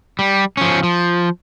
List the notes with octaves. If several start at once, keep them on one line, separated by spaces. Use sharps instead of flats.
G3
F3 C#4
F3